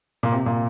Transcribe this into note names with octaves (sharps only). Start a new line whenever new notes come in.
A#2
C3
A#2